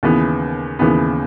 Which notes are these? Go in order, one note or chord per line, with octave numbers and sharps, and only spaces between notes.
D#2 C#3 E3 B3
D#2 C#3 E3 B3